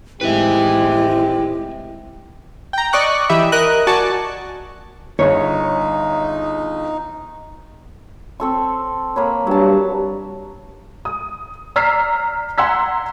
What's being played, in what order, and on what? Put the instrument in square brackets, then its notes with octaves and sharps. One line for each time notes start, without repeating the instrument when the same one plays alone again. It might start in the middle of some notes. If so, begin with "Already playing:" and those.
[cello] A2 G#3 [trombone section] D#3 C4 G4 [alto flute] E4 [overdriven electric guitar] B4 E5
[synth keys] G5 A#5
D5 D#5 C#6 F#6
E3 G4 D#5 E5 B5
A#4 D#5 F#6
F#4 D5 G#5 A5 C#6
[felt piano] G1 G#4 [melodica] D#4 [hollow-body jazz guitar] C#5
[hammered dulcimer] C4 A4 C#6
A#3 B4 C#5
[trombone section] G2 [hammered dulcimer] F#3 A5
[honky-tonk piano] D#6
D5 A#5 E6 F6 B6 C7
F#5 A#5 C6 E6 G#6 B6